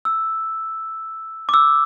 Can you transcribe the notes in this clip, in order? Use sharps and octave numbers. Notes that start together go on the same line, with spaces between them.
E6
D6
E6